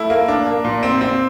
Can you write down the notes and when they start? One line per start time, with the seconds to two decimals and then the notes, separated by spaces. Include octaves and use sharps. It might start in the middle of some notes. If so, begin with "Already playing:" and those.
Already playing: A3 E4
0.10 A#3
0.28 D4
0.46 A#3
0.65 A#2
0.83 C4
1.01 C4